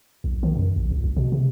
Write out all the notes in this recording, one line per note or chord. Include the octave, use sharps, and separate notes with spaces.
B1
D#3
F#2
A#1
C#2
B1
B2
C3